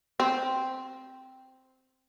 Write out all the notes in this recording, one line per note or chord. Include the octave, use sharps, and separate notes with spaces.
C4